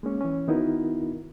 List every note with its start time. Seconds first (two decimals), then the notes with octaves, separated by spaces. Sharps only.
0.03 G#3 A#3 C#4
0.21 E3 C#4
0.48 D#3 B3 D#4 E4 F#4 A#4